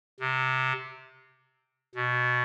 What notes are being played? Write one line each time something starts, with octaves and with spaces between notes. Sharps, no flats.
C3
B2